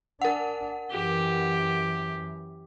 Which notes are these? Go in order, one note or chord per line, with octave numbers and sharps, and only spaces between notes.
D4 A#4 F#5
F#2 E3 G4